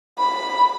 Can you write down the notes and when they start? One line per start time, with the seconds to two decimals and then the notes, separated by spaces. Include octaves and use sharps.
0.18 B5